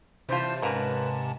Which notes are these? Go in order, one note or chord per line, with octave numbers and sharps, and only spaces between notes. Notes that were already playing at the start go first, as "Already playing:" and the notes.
C3 E3 G3 F4 C5 A5
G#2 A#3 C#4 B4